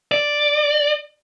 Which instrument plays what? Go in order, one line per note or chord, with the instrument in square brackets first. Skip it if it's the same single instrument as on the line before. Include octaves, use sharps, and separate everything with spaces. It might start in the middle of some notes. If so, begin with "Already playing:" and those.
[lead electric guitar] D5